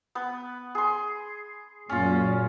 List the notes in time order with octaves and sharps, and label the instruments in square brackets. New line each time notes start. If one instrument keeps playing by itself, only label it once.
[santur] B3 B4
G#4 C6
[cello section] F#2 A#2 [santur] C#4 F4